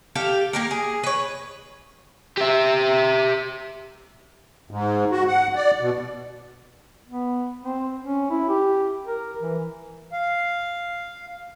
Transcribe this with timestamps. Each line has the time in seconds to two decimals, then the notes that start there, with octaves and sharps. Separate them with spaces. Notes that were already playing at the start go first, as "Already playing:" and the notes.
0.15 G4 A4 F5 G5
0.53 A#3 G4 A#4
0.71 G#4
1.03 B4 C#5
2.37 G4 E5
4.71 G#2
5.11 F#4
5.27 F#5
5.56 D5
5.81 B2
7.08 B3
7.62 C4
8.03 C#4
8.30 E4
8.49 G4
9.07 A#4
9.41 E3
10.12 F5